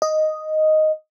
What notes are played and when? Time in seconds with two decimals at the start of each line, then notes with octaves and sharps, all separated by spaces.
0.02 D#5